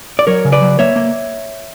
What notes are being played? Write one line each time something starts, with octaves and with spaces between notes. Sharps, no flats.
D5
F#3 A#4 C#5
C#3
B4 D5
F#3
A#3 C#5 E5
A#3